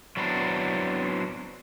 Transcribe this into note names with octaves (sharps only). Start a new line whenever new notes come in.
F#3 B3 C4 D4 E4